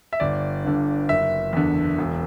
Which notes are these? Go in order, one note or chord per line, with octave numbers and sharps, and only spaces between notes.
E5
G1 D5
G2 D3
F#1 E5
E2 D3
E1